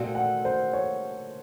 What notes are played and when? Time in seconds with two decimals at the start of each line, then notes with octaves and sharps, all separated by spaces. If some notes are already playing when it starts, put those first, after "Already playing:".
Already playing: A#2 A3 C4 D#4 F#4 F5
0.15 F#5
0.45 C5
0.73 C#5